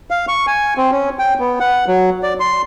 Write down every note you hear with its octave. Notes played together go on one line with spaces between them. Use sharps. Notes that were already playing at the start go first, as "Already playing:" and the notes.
F5
C#6
G#5
C4
C#4
G5
B3
F#5
F#3
D5
C6